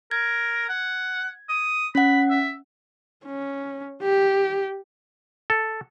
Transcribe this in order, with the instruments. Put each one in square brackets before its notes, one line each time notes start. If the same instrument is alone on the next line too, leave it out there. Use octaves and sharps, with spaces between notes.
[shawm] A#4 [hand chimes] G#6
[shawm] F#5
D#6
[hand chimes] C#4 F#5 [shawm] B5
[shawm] E5
[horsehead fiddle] C#4
G4
[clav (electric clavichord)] A4